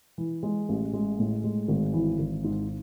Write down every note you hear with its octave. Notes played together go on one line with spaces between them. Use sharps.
E3
G#3
A1
G#3
A2
G#3
G#1
E3
G#1
G#2